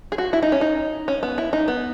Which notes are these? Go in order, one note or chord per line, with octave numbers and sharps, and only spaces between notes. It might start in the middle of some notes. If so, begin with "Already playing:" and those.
G#4
F#4
E4
D#4
C#4
D#4
C#4
B3
E4
D#4
B3